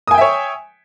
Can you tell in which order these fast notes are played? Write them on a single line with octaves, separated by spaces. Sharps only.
D#6 G#5 G5 E5 C#5